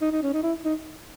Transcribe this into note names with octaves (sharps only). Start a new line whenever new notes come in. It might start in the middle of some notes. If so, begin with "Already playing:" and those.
D#4
D#4
C#4
D#4
E4
D#4